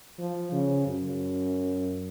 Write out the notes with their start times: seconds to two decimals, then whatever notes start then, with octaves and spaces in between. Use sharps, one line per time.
0.19 F3
0.52 C#3
0.86 F#2